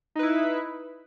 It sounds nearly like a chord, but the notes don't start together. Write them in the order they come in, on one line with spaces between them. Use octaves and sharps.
D#4 B4 E4